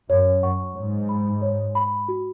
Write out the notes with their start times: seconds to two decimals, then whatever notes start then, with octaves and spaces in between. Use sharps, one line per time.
0.09 F#2 C#5
0.43 F#2 F#5 C#6
0.75 G#2 C#5
1.09 B5
1.42 C#5
1.75 B5
2.08 F#4